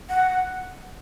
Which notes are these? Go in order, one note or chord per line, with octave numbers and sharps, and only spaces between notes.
F#5